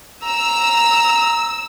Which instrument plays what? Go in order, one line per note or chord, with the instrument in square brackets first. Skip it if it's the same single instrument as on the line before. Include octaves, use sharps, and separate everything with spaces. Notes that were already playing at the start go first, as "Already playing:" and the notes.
[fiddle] A#5 [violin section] E6